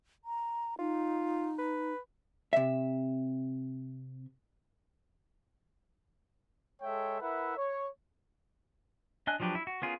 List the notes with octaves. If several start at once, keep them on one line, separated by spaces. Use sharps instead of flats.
A#5
D#4 F4
B4
C3 E5
G#3 A4 C#5 E5 G5
E4 A#4 B4 E5 F#5
C#5
D4 D#5 G#5 F#6
F3 F#3 D4 G4 B4
E4
F#4
B3 C#4 F4 G#4 A#4